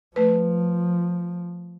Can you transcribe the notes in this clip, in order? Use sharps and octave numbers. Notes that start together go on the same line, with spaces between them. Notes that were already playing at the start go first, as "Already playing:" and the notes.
F3 A3 B4